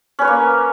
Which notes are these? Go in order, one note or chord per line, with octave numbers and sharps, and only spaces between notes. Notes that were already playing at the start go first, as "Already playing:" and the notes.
A#3 C#4 B4 C#5